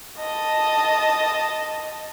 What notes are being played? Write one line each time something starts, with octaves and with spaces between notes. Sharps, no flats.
D#5 A5